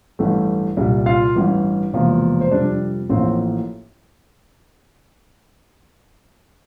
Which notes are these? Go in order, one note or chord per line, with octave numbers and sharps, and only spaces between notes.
A1 G2 E3 A3
C2 A#2 G3
F4 F5
A1 G2 E3
E1 E2 C3 F3 A#3
C5
F2 C3 G3 D4 D5
A1 A2 F3 A#3 C4 C5